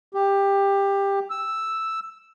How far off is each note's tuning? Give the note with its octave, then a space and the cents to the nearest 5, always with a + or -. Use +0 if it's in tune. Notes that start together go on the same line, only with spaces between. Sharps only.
G4 +15
E6 +0